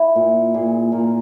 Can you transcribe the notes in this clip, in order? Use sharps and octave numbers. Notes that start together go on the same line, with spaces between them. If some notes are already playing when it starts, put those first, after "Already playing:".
Already playing: E4
A#2
A#2 G#4
A#2 A#4
A#4